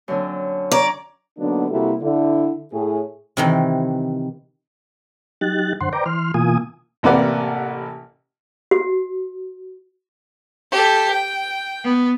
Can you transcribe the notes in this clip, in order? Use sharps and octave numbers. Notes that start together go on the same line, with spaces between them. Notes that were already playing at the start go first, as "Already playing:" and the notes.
F#2 D3 C4
C#5 D5 A#5 D6
D3 F#3 A#3 B3 D4 D#4
C3 G3 A#3 E4 F#4 A4
D3 E4
A2 G#4
C3 D#3 E3
F#3 D#4 G4 F#6 A6
F#2 D3 C5 F#5 C6
B4 C5 D5 G5 A#5 D6
E3 C6 F6
B2 E3 A#3 F4 G#5 D#6
A1 C3 A#3 B4 D5 F#5
F#4
G4 A4
G5
B3